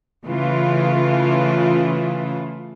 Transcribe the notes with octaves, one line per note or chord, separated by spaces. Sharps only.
C#3 E3 A3 F4